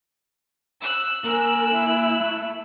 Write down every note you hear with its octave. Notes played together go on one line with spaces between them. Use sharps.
E6 F#6
A#3 A#4 G#5 E6 F#6
E4
A3